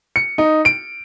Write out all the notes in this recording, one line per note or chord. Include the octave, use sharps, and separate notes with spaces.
C#7
D#4
D7